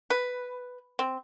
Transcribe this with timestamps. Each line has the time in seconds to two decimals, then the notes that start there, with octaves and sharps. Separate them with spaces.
0.10 B4
0.99 C4